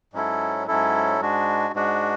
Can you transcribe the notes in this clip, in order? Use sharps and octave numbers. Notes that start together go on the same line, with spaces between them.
G#2 F#3 C#4 E4 A4
G#2 F#3 C#4 E4 A4
G#2 G#3 D4 F#4
G#2 G#3 D4 F#4